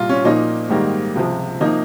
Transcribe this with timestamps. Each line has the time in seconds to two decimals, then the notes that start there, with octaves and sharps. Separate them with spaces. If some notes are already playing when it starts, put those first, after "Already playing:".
Already playing: C2 A#2 G3 F4
0.09 C#4
0.25 A#2 F3 A#3 D#4
0.69 G#2 D#3 G3 A#3
1.15 C#2 C3 F3
1.60 C3 F3 A#3 D#4